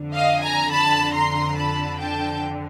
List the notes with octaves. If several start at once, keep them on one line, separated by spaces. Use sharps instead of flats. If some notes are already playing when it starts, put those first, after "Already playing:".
Already playing: F2 D3
D#5 F5
G#5 A#5
A5 B5
A#5 C6
A5 B5
G5 A5